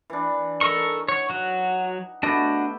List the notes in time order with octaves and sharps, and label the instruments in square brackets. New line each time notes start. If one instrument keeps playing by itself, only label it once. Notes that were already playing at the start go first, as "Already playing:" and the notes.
[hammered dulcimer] E3 D4
[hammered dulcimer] D#4 [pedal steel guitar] A4 A#4 C#6
[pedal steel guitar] C#5 [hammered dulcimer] F#5
[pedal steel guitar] F#3 F#4
[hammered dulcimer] A3 B3 G4 [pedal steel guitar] D4 F#4 D#5